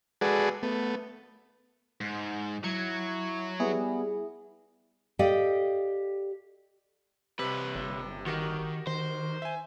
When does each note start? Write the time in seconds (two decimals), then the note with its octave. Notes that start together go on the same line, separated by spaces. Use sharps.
0.21 G#3 F#4 G#4 A4 B4 D5
0.63 A3 B3
2.01 G#2
2.64 F#3 E4 G#6 C#7
3.60 G3 B3 E4 G#4
5.19 G4 A4 D5 D#5 F5 G5
7.39 C2 C3 B4
7.75 G1
8.26 D#3 F#4 G4 A#4
8.87 D#3 C5
9.42 E5 G#5